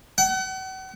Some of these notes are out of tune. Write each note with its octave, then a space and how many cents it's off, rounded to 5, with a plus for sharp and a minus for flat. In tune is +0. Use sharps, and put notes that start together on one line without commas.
F#5 +40